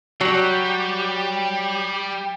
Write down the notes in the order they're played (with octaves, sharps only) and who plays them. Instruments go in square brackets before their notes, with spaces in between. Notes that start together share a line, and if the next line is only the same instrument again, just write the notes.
[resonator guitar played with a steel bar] F#3 [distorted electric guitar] G3 [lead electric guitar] G4